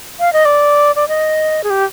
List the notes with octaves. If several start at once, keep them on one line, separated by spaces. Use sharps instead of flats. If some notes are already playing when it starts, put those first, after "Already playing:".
F5
D#5
D5
D5
D#5
G#4
G4